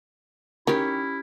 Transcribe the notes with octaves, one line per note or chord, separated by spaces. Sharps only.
D#3 C#4 E4 G4